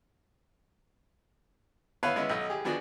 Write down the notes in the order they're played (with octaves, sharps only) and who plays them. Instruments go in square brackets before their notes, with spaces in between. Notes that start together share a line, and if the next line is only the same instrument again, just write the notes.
[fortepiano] B3 E4 B4 C#5 F5
G#3 B3 C#4 E4
B1 D#5
G4 G#4
F3 B3 D4 F#4 G#4